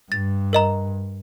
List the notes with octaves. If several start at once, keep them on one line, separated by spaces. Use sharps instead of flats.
G2 A6
A#4 D#5 A#5